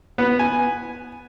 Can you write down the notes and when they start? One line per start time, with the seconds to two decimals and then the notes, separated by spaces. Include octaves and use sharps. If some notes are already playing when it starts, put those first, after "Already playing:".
0.18 B3
0.39 G#5